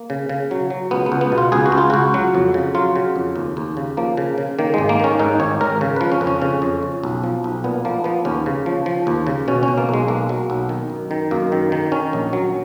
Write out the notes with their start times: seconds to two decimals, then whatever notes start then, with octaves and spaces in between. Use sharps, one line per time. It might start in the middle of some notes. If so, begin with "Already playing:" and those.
Already playing: A#3
0.10 C#3
0.29 C#3
0.51 F#3
0.70 F#3
0.91 C#2 B3
1.06 B3
1.12 C#2
1.21 B3
1.32 B2
1.38 F4
1.52 C#2 G#4
1.66 F#4
1.72 C#2
1.78 F4
1.90 C#2 F#4
2.14 F#3
2.35 F2
2.54 C#3
2.75 F#3 F4
2.96 C#3
3.16 F2
3.36 D#2
3.57 D#2
3.77 C#3
3.97 F3 A#3
4.17 C#3
4.38 C#3
4.59 D#3 A#3
4.74 G#1 G#3
4.89 A#3
5.00 D#3 C#4
5.19 G#2 D#4
5.40 G#1 C#5
5.61 G#1 A#4
5.81 C#3
5.96 F3 B4
6.12 C#4
6.21 F2
6.27 C#4
6.42 C#3 C#4
6.62 F2
6.83 F2
7.04 B1
7.24 F3
7.44 B1
7.64 A#2 B3
7.85 F3 A#3
8.04 F3 B3
8.25 D#2 C#4
8.46 C#3
8.66 F3
8.86 F3
9.07 D#2
9.27 C#3
9.48 B2 C#4
9.63 C#4
9.68 B2
9.78 A#3
9.89 B1 G#3
10.08 B1 A#3
10.29 F#3
10.50 B1
10.69 D#3
10.90 F#2
11.11 D#3
11.31 F#2 A#3
11.52 D#3
11.72 D#3
11.92 D#3 C#4
12.13 A#1
12.33 F#3